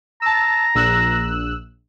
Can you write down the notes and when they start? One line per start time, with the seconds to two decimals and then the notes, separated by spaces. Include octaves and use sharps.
0.22 A5 A#5 E6
0.75 A#1 E6 F#6